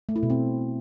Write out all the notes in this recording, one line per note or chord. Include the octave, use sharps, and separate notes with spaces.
A3
E4
B2
C4